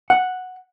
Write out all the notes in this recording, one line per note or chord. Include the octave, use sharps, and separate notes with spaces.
F#5